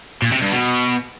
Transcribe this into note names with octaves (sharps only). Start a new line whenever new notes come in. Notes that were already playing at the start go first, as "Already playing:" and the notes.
A#2
C3
G2
B2